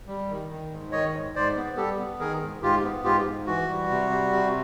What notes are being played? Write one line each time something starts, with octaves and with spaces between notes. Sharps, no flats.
G3
D#3
D#3
G#2
D#3 C#5 D#5
G#2
G#2 C5 D5
B3
G3 G4 A4
B3
D#3 G#4 A#4
G#2
G#2 F4 G4
B3
G#2 F4 G4
G#2
E3 F#4
G3
C3
G3
C3